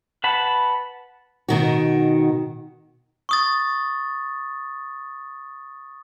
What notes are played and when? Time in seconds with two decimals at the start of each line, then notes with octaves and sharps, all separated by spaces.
0.24 B4 F#5 A5 B5
1.48 B2 D#3 F#4
3.29 C#6 D#6 A6